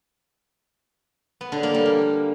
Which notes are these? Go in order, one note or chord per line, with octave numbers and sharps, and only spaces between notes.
B3
D3
A#3
G3
A#3